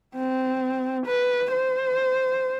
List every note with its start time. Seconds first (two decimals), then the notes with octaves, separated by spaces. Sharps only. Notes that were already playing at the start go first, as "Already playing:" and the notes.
0.15 C4
1.06 B4
1.52 C5